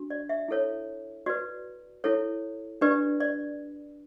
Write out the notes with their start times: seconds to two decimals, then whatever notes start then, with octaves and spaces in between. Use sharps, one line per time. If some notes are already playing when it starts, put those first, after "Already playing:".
Already playing: D4 F#4
0.10 D5
0.29 E5
0.48 E4 A4 C#5
1.26 F#4 B4 D5
2.04 E4 A4 C#5
2.81 D4 G4 B4 D5
3.20 D5